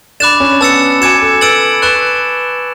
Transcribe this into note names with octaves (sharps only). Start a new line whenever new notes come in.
D4 B5 D6 F#6 A6 E7
C#4
B3 A5 E6 A6 C#7
F#4 G#5 D6 G#6 C#7 E7
A4
B4 E6 A6 D7 F#7
B4 C#6 F#6 A6 E7